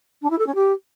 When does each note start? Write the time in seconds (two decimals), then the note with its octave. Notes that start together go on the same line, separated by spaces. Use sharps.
0.22 D4
0.30 E4
0.38 A4
0.47 C#4
0.55 G4